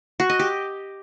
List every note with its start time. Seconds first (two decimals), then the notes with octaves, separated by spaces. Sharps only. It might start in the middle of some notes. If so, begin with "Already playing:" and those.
0.20 F#4
0.30 D#5
0.39 G4